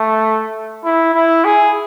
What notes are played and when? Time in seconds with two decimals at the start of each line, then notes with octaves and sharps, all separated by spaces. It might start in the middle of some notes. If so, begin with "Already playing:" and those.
Already playing: A3
0.84 E4
1.14 E4
1.44 G#4